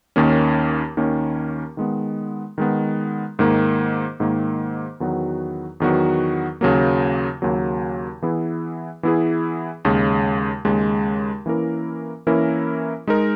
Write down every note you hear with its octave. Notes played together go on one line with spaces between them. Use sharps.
D#2 D#3 A#3 C#4
D#2 D#3 A#3 C#4
D#3 G#3 B3
D#3 G#3 B3
G#2 D#3 A#3
G#2 D#3 A#3
E2 D#3 F#3 B3 F#4
E2 D#3 F#3 B3 F#4
D#2 C#3 F#3 A#3
D#2 C#3 F#3 A#3
E3 B3 E4 G#4
E3 B3 E4 G#4
D#2 C#3 G#3
D#2 C#3 G#3
E3 A#3 C#4 E4 A#4
E3 A#3 C#4 E4 A#4
G#3 D#4 A#4